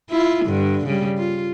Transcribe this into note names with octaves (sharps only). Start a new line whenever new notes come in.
E4 F4
G2 D3
C#3 G3
F4